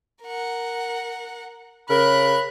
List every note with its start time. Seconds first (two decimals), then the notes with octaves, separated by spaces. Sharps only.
0.23 A#4 F#5
1.89 C#3 A#4 B5 F#6